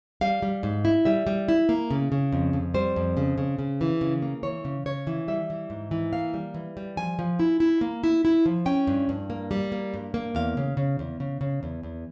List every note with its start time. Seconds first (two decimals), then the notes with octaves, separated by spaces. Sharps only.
0.21 G3 F5
0.43 G3
0.63 G#2
0.85 E4
1.05 G3 E5
1.27 G3
1.48 E4
1.69 A#3
1.91 C#3
2.12 C#3
2.33 F2
2.53 F2
2.74 G3 C5
2.96 F2
3.17 C#3
3.38 C#3
3.59 C#3
3.81 E3
4.01 C#3
4.22 A#3
4.43 E3 C#5
4.65 C#3
4.86 C#3 C#5
5.07 E3
5.28 G3 E5
5.50 E3
5.70 G#2
5.91 E3
6.13 A#3 F5
6.34 G3
6.54 E3
6.77 G3
6.97 F3 G#5
7.19 F3
7.40 E4
7.60 E4
7.81 A#3
8.04 E4
8.25 E4
8.46 F3
8.66 C#4 G5
8.87 G2
9.09 G2
9.30 A#3
9.51 G3
9.72 A#3
9.94 G2
10.14 A#3
10.35 E2 F5
10.57 C#3
10.77 C#3
10.99 E2
11.20 C#3
11.41 C#3
11.63 E2
11.83 E2